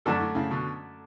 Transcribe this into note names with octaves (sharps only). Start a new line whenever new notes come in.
F#2 A2 D3 A3 D4 A4
A2
A2 C#3
B2 D3